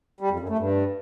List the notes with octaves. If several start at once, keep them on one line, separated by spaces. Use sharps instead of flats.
G3
F2
F#2
A3
G2